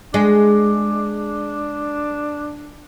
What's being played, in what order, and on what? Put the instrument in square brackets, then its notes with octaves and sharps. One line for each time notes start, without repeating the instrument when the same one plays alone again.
[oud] G#3 [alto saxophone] D4